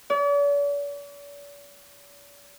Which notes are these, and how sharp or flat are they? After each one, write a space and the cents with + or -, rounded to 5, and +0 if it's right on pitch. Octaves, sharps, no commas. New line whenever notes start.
D5 -45